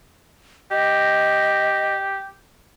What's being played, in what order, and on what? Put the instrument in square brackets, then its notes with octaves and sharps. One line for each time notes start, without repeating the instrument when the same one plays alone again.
[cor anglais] G4 [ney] D#5